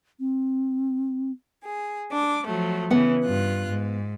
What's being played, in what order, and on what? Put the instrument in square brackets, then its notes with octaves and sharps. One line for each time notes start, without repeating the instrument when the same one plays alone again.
[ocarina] C4
[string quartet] G#4
D4 D6
F3 F#3 A3
[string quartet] C#3 E3 [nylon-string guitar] B3 F#5
[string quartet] G2 F4 F#6
G#2